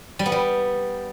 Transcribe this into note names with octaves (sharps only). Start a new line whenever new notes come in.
G3
B3
G3